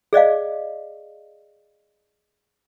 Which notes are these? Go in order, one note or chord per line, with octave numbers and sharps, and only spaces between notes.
G#4 D5 D#5 F5